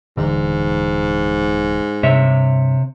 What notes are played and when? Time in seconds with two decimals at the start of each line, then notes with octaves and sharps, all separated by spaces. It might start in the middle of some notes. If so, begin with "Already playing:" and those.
0.17 D#1 G#2 D3 E3
2.03 G2 C3 C#5 E5